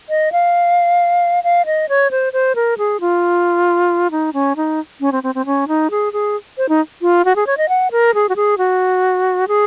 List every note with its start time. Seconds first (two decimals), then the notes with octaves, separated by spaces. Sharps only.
0.09 D#5
0.32 F5
1.44 F5
1.66 D#5
1.89 C#5
2.11 C5
2.33 C5
2.55 A#4
2.78 G#4
3.01 F4
4.11 D#4
4.33 C#4
4.56 D#4
5.00 C#4
5.12 C4
5.23 C4
5.35 C4
5.46 C#4
5.68 D#4
5.90 G#4
6.13 G#4
6.58 C5
6.69 D#4
7.02 F4
7.25 F#4
7.36 G#4
7.47 C#5
7.57 D#5
7.69 F#5
7.91 A#4
8.14 G#4
8.29 F#4
8.36 G#4
8.58 F#4
9.48 G#4